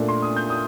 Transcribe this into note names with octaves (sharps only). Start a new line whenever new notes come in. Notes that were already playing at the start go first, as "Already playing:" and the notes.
Already playing: A#2 A3 D4
C6
D#6
G6
D#6